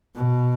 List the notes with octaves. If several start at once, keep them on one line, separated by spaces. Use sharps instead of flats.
B2